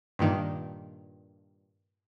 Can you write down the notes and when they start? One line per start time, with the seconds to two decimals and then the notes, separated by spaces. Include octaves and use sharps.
0.19 G2 A#2 D#3